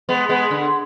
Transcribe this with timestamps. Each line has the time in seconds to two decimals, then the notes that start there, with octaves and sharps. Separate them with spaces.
0.09 G#3 B3
0.29 G#3 B3
0.51 D3